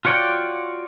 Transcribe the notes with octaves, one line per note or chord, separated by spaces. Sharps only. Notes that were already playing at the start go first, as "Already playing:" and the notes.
F4 F#4 C#5 D5 G5